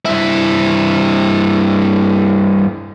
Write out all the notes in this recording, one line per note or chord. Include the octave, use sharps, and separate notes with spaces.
G2 E4